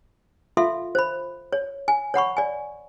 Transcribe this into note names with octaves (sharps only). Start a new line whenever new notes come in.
F4 A4 E5 F5 C6
C5 B5
C#5
G#5
C#5 F#5 B5 C#6
D5 G#5